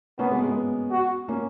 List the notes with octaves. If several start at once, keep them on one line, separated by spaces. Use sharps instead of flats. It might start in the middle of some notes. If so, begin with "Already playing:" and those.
A#3 B3 C#4
G#3 B3
G#3 B3
F#4
A#3 C#4